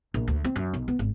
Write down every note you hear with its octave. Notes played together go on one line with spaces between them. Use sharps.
A#1
D2
C4
F#2
B1
B3
G#1